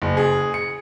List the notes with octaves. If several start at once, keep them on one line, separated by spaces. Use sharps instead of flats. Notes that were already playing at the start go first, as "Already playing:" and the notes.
F#1
G#4
C#7